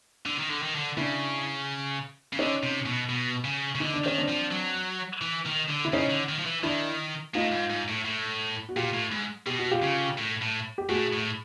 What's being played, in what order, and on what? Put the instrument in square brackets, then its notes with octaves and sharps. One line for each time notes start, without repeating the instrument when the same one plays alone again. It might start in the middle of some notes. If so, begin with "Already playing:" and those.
[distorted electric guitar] D3
D#3
D3
D#3
D3
[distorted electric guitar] C#3 [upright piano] D4 E4
[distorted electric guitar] C#3
[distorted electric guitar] D3 [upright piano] C#4 D#4
[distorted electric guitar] C3
B2
B2
C#3
C#3
[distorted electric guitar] D3 [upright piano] D#4
[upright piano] D4
[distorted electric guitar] D#3 [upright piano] C#4
[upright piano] C4 D4
[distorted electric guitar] F3
F#3
E3
D#3
D3
[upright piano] E4
[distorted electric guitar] C#3 [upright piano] C#4 D#4
[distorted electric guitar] D3
D#3
F3
E3
[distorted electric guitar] D#3 [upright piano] D4 E4
[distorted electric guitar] A2 [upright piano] D#4 F4
[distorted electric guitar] G#2
G#2
A2
A2
[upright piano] F#4
[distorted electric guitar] A#2 [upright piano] F4 G4
[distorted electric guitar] A2
G#2
[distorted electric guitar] B2 [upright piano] G4
[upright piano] F#4
F4 G4
[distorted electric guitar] C#3
A2
A2
[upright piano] G4
[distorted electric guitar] A2 [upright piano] F#4 G#4
[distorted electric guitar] A2